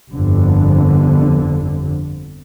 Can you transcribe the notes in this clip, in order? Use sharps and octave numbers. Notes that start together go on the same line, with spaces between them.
G1 F2 D3